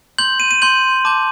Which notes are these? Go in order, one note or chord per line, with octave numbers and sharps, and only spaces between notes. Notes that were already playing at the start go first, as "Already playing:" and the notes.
C6 G6 F#7
D#7
D#7
C6 G6 F#7
A5 D6 G6